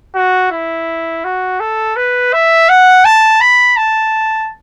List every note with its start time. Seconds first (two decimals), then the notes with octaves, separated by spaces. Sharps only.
0.16 F#4
0.51 E4
1.24 F#4
1.60 A4
1.96 B4
2.33 E5
2.69 F#5
3.05 A5
3.41 B5
3.77 A5